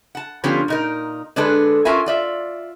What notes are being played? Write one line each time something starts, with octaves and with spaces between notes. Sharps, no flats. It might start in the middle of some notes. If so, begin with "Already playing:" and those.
F#5 A5
D3 F3 B3 C#4 F4 G4
A#2 D#4 A#4
D3 G#3 D4 G#4 A4 B4
C#4 F4 A#4 E5 G#5
F4 D5 E5